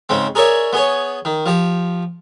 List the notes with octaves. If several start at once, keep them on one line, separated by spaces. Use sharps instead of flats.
G#2 C#3 C4
G#4 A#4 C#5 D5 E5
B3 G#4 C#5
D#3
F3 G4